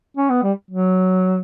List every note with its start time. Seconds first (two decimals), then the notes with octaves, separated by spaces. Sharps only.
0.17 C#4
0.30 B3
0.43 G3
0.71 F#3